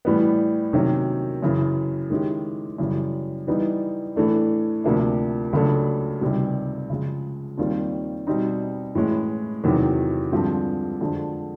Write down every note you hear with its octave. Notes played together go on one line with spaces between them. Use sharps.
A2 E3 G3 B3
C3 D#3 F#3 A#3 C#4
F#2 C#3 E3
D#3 G#3 C#4 E4 G4
F#2 C#3 E3 G3
E3 G3 B3 D#4
A2 E3 A3 D4
D2 C3 F3 A#3 D4
C#2 C#3 F#3 A3 D4
C#2 C3 D#3 G3
C#3 F3 G#3
D#2 D#3 G3 C4 F4
B2 G3 C4 D#4
A2 E3 G#3 C#4
E2 C3 D#3 F#3
G2 D3 F3 G#3 C4
F2 D3 F3 G#3